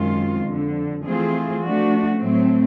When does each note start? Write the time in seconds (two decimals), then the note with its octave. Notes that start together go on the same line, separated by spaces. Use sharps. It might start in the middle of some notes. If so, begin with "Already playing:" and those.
Already playing: F#2 D#3 G#3 C4 F4
0.47 F2 D3 F3
1.04 E3 A3 C4 F4 G#4
1.61 F3 A3 D4 F#4
2.18 A2 F#3 A3 C4